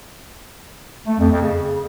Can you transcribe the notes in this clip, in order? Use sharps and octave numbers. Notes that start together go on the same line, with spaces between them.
A3
F2
F2
C#3